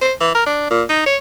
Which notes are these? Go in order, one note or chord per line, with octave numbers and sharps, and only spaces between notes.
C5
E3
A#4
D4
A#2
D#4
C#5